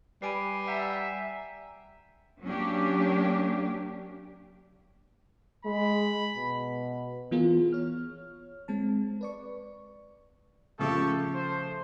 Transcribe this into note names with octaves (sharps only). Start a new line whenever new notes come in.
G3 B4 G#5 B5 C7 D7 D#7
E5 F#5 G#5 A#5 G6 B6
F#3 A#3 C#4 D4 G4
G#3 B5
B2
E3 B3 F4 G#4 A#4
C#5 F6
G#3 C4 A5
B4 D5 C#6
C#3 F3 A3 G4 A4 C#6
C5